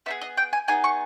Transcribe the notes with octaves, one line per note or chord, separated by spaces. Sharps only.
B3 D#4 G#4 E5
D#5
G5
G#5
B3 D#4 G#4 G#5
C#6